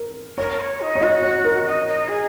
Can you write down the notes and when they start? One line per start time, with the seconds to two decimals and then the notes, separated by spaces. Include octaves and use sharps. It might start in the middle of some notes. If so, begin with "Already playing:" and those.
Already playing: A#4
0.38 A#4 C#5
0.59 C#5
0.80 D#4
0.95 C#5
1.01 F#4 D#5
1.23 C#5
1.44 A#4
1.66 D#4
1.87 D#4
2.08 G#4